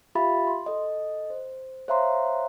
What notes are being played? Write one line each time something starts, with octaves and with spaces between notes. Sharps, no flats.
F4 G4 E5 F5 B5 A6
C6
A4 D#5
C5
C5 C#5 E5 F5 A#5 C6